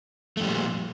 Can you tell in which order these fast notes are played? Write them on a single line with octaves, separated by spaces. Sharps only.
A3 F2 G3 A#2